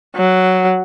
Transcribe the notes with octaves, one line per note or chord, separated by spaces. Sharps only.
F#3